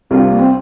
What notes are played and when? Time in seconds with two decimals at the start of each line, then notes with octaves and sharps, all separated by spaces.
0.10 C2 C3 G3 C4 D4 F4
0.29 A#3
0.39 C4